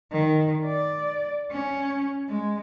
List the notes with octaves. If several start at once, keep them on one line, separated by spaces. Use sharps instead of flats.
D#3
D5
C#4
G#3